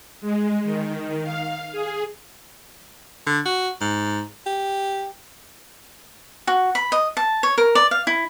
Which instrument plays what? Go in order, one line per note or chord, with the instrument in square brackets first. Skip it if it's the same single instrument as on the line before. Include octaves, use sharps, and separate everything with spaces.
[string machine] G#3
D#3
F5
G#4
[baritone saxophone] D3
F#4
G#2
G4
[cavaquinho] F#4
B5
D#5
A5
C#5
A#4
D5
F5
E4